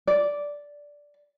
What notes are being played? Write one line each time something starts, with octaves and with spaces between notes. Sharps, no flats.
D5